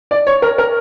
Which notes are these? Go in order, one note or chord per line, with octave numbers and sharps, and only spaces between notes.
D5
C#5
A#4
A#4